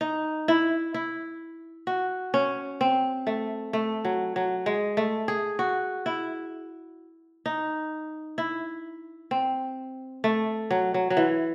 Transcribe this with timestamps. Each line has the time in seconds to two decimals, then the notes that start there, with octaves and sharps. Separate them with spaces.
0.01 D#4
0.48 E4
0.94 E4
1.87 F#4
2.34 C#4
2.81 C4
3.27 A3
3.73 A3
4.05 F#3
4.36 F#3
4.66 G#3
4.97 A3
5.28 G#4
5.59 F#4
6.06 E4
7.46 D#4
8.38 E4
9.31 C4
10.24 A3
10.71 F#3
10.94 F#3
11.10 F#3
11.17 E3